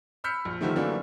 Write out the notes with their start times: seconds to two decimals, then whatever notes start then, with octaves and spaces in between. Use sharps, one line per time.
0.24 B5 E6 F6 G6 B6 C#7
0.45 A#1
0.61 D3 D#3 F3 G3 A3
0.76 D3 E3 F#3 A3 A#3 D4